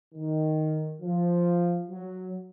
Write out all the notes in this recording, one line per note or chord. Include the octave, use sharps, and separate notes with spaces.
D#3
F3
F#3